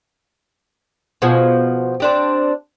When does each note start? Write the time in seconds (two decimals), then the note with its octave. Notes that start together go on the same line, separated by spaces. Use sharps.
1.22 B2 F3 G#4
2.00 C4 D4 G4